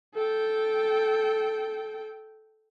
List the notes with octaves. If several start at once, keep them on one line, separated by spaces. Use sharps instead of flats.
A4 G5